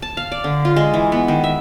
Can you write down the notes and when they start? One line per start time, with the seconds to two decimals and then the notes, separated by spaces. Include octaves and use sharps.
0.02 A5
0.17 F5
0.32 D5
0.44 D3
0.65 F4
0.76 G#3
0.94 E3
1.12 B3
1.28 D#3
1.44 E5